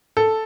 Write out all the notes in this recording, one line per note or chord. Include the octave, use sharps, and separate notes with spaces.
A4